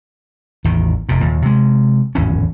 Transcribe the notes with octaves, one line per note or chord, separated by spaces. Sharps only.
A1 E2 D#3
F1 A#2
D#2 A#2
C3 G#3
D1 G#1 E2 C#4